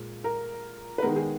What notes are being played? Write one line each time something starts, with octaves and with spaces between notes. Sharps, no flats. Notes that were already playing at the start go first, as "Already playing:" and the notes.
Already playing: A#2 G#3
A#4
B4
D#3 G#3 B3 A#4
G#4